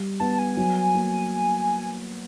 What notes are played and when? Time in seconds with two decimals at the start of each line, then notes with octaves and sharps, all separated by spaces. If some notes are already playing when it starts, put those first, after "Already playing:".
Already playing: G3
0.20 B3 A5
0.39 G#5
0.57 F#3
0.95 A#3